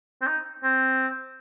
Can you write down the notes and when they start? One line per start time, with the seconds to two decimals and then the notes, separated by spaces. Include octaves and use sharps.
0.22 C4
0.27 D#4
0.63 C4